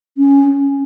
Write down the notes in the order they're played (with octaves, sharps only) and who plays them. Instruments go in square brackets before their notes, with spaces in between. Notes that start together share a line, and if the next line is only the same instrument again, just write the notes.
[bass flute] C#4